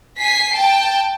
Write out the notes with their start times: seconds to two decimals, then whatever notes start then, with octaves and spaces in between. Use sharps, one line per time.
0.18 G#5 B6 C7
0.54 G5 A5